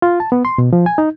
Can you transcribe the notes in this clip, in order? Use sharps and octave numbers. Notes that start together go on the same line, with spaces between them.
F4
A5
B3
C6
B2
F3
G#5
D#4